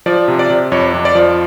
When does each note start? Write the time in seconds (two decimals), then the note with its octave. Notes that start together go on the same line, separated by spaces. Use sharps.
0.06 F3 D5
0.28 C3
0.39 D5
0.50 C3
0.72 F2 C#5
0.94 F2
1.05 D5
1.15 F3